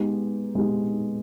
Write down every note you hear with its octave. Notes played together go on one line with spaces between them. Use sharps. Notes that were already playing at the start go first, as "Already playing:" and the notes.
Already playing: G#3 B3 D#4 G4
G#3 B3 D#4 G4